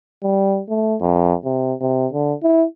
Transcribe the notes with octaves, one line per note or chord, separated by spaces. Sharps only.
G3
A3
F2
C3
C3
D3
E4